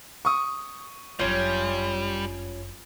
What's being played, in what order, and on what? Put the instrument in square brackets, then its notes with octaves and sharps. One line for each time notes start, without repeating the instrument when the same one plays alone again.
[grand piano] C#6 D#6
[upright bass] G1 F#2 [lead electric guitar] G3 [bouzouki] C#4 F4